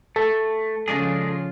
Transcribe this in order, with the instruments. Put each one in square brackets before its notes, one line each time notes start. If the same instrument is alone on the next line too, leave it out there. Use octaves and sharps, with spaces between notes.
[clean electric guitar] A3 [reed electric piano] A4
[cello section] C#3 F3 F4 [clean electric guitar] G#3 D4 G#4